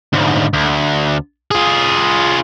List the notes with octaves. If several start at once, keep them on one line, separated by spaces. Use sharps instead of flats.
D2 G#2
D2
F4 G#4